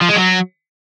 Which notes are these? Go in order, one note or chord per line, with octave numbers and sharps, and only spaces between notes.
F3
G#3
F#3